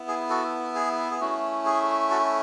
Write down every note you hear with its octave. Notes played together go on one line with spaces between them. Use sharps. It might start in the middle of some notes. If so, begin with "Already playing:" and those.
Already playing: B3 E4
G#4
F#4 A4
G#4
G#4
A3 C#4 E4 F#4
G#4
F#4 A4